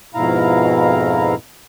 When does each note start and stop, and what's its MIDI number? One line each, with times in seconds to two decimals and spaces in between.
0.15 1.35 41
0.15 1.35 44
0.15 1.35 47
0.15 1.35 64
0.15 1.35 77
0.15 1.35 82